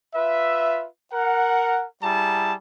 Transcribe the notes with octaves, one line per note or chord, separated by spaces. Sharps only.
F4 B4 E5
A#4 F#5
G3 E4 G#4 A5 A#5